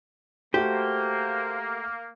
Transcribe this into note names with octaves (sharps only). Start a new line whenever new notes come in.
A3 A#3 F#4 G4 C5